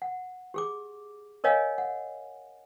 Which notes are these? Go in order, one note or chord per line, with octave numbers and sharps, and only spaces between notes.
F#5
G4 G#4 D6
A#4 C#5 D#5 F5 G#5
F#5